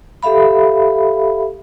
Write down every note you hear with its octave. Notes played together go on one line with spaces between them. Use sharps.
G4 A4 E5 F5 B5